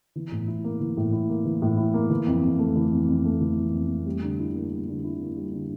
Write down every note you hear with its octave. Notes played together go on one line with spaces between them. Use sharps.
E3
A2
E4
A#3
E3
A2
E4
A#3
E3
A2
E4
A#3
E3
F2
F2
A3
E3
F2
F2
A3
E3
F2
F2
A3
G3
D3
E4
A#3
G3
D3
E4
A#3
G3
D3